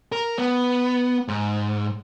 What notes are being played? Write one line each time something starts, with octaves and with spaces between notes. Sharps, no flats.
A#4
B3
G#2